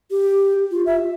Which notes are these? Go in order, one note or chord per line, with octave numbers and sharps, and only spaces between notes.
G4
F4
E5